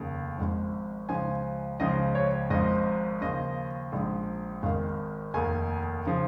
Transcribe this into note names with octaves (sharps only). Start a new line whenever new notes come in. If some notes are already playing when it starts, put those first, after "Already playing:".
Already playing: F1 D#2 C#3
G#1 G#2 F3
C#2 C#3 F3 G#5
C#2 C#3 F3 D#5
C#5
G#1 G#2 F3 D#5
D#2 C#3 F3 D#5
A#1 G#2 F3
G#1 G#2 D#3 F5
F1 D#2 D#3 G#5
C#3 F3